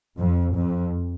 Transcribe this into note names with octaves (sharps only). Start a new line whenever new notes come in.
F2
F2